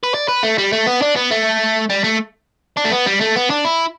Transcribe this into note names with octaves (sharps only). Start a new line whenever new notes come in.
B4
D5
B4
A3
G3
A3
B3
D4
B3
A3
G3
A3
D4
A3
B3
G3
A3
B3
D4
E4